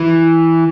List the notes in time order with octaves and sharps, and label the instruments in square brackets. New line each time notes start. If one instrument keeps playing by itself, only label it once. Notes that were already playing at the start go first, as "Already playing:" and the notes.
Already playing: [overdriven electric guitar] E3